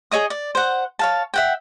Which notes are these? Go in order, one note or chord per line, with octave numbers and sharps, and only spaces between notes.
G#4 C#5 D#5 D#6
D5
C5 F#5
C#5 F5 A5
E5 F#5 G5